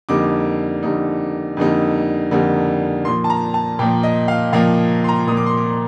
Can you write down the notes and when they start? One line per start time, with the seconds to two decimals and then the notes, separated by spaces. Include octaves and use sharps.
0.09 F2 D3 G3 A#3 D#4 D6
0.83 F2 D3 G3 A#3 D#4
1.57 F2 D3 G3 A#3 D#4
2.31 F2 D3 G3 A#3 D#4
3.05 A#2 F3 A#3 C6
3.24 A5
3.30 A#5
3.54 A5
3.79 A#2 F3 A#3 G5
4.03 D#5
4.28 F5
4.53 A#2 F3 A#3 F5
5.04 C6
5.08 A#5
5.27 A#2 F3 A#3 D#6
5.37 D6
5.46 C6
5.57 D6